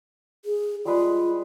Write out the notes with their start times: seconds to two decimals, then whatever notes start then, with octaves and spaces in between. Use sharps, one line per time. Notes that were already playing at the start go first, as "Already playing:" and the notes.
0.45 G#4
0.85 G3 G#3 F4 B4